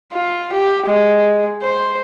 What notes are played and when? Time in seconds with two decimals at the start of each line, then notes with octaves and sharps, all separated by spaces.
0.13 F4
0.53 G4
0.87 G#3
1.63 C5